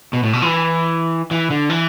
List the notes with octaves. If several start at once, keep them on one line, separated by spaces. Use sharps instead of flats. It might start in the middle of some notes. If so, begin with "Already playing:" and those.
B2
A2
B2
E3
E3
D3
E3